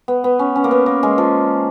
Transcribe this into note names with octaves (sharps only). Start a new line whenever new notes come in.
B3
B3
C#4
C#4
A#3
B3
A#3
G#3
F3